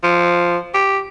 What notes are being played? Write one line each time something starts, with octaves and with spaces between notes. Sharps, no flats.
F3
G4